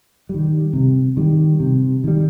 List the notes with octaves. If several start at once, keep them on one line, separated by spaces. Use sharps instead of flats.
D#3 G3
C3
D#3 G3
C3
D#3 G3